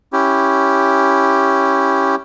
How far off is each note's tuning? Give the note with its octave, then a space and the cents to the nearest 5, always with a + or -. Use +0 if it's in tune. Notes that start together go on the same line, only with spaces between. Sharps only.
C#4 +0 E4 +0 G4 +0